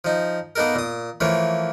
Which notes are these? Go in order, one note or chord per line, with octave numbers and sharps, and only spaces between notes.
F3 D#4
A#3 B3 D#4 A4 A#4
A#2 D#6
E3 F3 A3 A#3 C#5